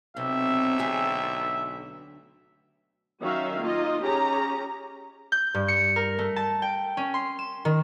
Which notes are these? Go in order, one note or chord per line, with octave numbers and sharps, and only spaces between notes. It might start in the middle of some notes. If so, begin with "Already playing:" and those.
B1 C3 E5
D2 G4 G#4
D#3 F#3 C#4 F#4 E5 F5
A#3 D#4 F4 D#5
C#4 G4 G#4 A#5
G6
G2
C#7
A#4
A3
A5
G5
C#4
C6
E7
D#3